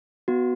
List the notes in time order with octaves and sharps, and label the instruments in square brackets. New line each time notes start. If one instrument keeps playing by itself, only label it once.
[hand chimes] B3 F#4